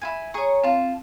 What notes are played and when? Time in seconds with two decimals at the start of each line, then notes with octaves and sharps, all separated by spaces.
0.01 E4 F4 G#5
0.34 G#4 C#5 A#5 C#6
0.64 C4 F4 A5